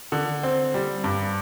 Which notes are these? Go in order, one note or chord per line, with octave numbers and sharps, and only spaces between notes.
D3
C4
G3
G2